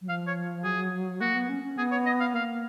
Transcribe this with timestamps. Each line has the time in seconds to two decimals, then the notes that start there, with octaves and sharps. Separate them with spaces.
0.02 F#3
0.09 F3 F5
0.27 C#5
0.64 F#3 G#4
1.21 A#3 F#4
1.35 B3
1.49 C#4
1.64 C#4
1.77 B3 G#4
1.91 C#5
2.06 D#5
2.20 F5
2.34 A#3 F5